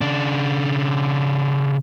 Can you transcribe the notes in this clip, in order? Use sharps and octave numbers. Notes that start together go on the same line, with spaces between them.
C#3 D4